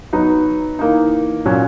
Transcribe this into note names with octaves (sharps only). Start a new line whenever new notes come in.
F#3 B3 D#4
E3 A#3 D#4
A#2 F#3 C#4